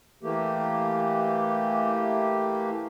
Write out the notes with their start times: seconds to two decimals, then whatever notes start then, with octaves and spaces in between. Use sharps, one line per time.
0.23 E3 A3 A#3 G4